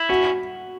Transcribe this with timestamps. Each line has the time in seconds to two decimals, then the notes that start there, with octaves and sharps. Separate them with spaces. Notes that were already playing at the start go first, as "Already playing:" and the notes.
Already playing: E4
0.09 C#4 F#4